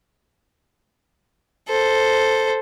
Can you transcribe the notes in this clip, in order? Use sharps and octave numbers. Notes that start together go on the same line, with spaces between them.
A4 C5